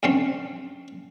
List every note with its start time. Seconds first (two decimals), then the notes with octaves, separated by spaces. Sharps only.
0.03 G2 C#3 C4 C#4 C6